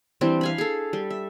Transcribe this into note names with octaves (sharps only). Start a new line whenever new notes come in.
E3 G3 C4 D4
F5 G#5 B5
G#4 A4
G3
E5